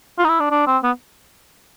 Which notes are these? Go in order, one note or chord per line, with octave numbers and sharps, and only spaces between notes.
F4
D#4
E4
D4
D4
C4
B3